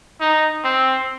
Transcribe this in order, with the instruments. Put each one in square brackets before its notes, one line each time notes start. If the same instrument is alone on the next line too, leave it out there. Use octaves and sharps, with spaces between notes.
[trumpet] D#4
C4